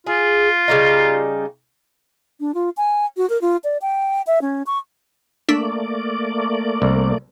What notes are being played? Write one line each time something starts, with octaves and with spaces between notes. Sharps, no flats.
F4 G#4
C#3 G3 D#4
D4
F4
G#5
F#4
A#4
F4
D5
G5
E5
C#4
C#6
A3 A#3 D4 D5 E6 B6
C2